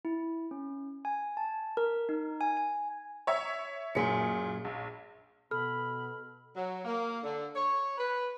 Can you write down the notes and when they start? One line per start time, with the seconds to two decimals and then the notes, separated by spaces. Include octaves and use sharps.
0.05 E4
0.51 C#4
1.05 G#5
1.37 A5
1.77 A#4
2.09 D#4
2.41 G#5
2.57 G#5
3.27 C#5 E5
3.95 F#2 A#2 G#4 B6 C#7
4.65 A#1
5.51 B2 A4 B5 F6
6.55 F#3
6.85 A#3
7.23 D3
7.55 C#5
7.98 B4